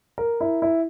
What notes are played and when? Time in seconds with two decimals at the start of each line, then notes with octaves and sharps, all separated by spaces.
0.18 A#4
0.40 E4
0.62 E4